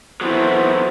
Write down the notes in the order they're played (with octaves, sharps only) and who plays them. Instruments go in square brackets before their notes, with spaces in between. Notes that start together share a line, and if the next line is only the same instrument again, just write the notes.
[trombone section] D#2 E3 B3 [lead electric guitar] C3 F#3 [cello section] E4 [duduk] C5